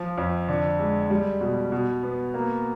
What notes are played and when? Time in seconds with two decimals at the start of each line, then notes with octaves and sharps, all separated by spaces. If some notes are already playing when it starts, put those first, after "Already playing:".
Already playing: F3
0.18 F2
0.48 D3
0.79 G#3
1.10 G3
1.41 B2
1.72 B2
2.03 B3
2.34 A#3